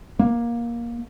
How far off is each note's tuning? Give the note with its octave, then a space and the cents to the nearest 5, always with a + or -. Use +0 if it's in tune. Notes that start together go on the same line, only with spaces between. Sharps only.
A#3 +15